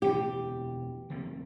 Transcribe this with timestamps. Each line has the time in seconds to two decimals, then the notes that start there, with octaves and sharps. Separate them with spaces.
0.02 E1 D2 C3 E3 G4
1.10 D2 C3 F3 A#3